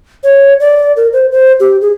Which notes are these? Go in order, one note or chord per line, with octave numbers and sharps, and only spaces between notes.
C#5
D5
A#4
C5
C5
G4
G#4